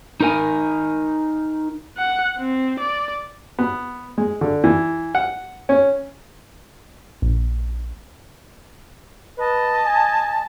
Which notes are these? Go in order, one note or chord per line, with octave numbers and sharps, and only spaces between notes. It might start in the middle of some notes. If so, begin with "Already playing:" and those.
D#4 A#4 G#5
F#5
C4
D5
B3
G#3
D3
E3
F#5
C#4
A#1
B4 D#5 A5
G#5